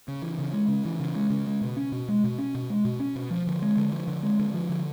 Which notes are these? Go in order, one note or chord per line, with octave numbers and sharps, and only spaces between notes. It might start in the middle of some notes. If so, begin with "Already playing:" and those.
C#3
E3
C#3
G#3
C#3
E3
C#3
G#3
C#3
G#3
B2
C#4
B2
G#3
B2
C#4
B2
G#3
B2
C#4
B2
F3
D3
G#3
D3
F3
D3
G#3
D3
F3
D3